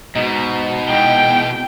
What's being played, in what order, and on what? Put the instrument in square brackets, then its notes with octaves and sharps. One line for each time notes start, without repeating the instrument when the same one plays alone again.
[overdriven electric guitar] G#2 [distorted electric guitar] B2 [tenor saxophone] D#4
[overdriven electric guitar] E2 G#3 [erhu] G5